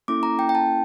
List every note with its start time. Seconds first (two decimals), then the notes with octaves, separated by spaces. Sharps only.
0.08 A#3 C#4 E4 A4 D6
0.23 A#5
0.39 G5
0.49 G5
0.55 A5